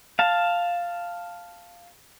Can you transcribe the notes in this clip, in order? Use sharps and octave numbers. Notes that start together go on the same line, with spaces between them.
F5 A5